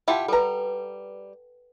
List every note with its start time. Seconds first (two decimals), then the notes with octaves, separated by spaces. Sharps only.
0.08 E4 F4 G4 F#5 G5 A5
0.28 G3 A4 B4 A#5